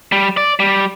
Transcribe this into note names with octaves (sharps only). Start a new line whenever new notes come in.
G3
D5
G3